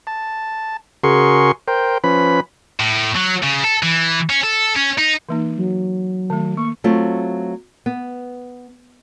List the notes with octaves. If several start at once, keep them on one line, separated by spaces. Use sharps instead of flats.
A5
C#3 F#4 G#4 A#4 C6 C#6
A#4 C5 G5
F3 C#4 B4 B5
A2
F#3
C#3
A4
E3
C#4
A4
C#4
D#4
E3 A#3 D#4
F#3
D#3 A3
A#3 C#6
F#3 A3 C4 F4
B3